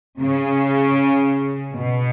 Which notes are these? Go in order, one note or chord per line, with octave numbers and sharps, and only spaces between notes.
C#3
B2